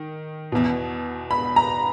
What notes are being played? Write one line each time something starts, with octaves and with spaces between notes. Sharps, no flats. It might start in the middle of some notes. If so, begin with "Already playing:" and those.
Already playing: D#3
E2 B2
B5
A#5